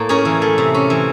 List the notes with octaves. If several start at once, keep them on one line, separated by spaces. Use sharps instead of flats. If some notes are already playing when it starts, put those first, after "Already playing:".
Already playing: A2 A#3
C#4 G#4 A#4
E3
A3
C3
C#4
E3